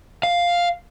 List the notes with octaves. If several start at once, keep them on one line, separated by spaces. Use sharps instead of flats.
F5